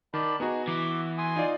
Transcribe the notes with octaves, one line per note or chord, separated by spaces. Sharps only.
D#3 D5 A5 B5
B3 D#4 F#4 G#4
E3 D6
G#5 C6 D#6
D#4 F4 D5